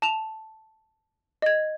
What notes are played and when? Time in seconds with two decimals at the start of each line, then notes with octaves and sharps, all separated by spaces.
0.02 A5 E7 F7
1.42 D#5 G#6